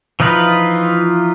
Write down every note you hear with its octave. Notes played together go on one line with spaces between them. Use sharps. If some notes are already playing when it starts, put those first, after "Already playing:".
E3 F3 D#4 F4 B4